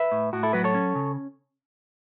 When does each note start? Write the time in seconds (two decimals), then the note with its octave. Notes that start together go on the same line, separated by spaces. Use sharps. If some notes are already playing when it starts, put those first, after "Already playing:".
Already playing: B4 E5
0.12 A2
0.33 A2 F#4
0.43 E4 A4
0.53 F#3 F#4 B4
0.64 A4 C#5
0.75 C#4
0.95 C#3